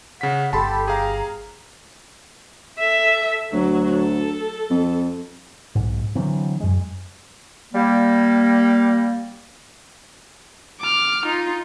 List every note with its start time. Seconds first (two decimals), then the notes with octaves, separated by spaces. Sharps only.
0.21 C#3 F#5 B6
0.53 G1 G4 A4 A5 B5 C6
0.88 G#4 F5 A#5
2.79 A4 E5
3.52 D2 F#3
3.93 A4
4.70 F2
5.75 B1 G#2
6.15 D3 E3 F#3 C4
6.60 F#2 G#3
7.74 G3 A#3
10.80 D6 F6
11.26 D#4 F4